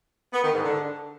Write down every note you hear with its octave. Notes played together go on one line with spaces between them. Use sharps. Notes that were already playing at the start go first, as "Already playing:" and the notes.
B3
D#3
G#2
D3